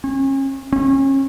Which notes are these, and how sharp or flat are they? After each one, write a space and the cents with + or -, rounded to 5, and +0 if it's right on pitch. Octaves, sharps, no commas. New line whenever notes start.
C#4 -35
C#4 -35